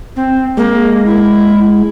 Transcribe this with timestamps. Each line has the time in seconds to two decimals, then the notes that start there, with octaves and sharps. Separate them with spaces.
0.16 C4
0.57 G#3 A#3
1.06 E4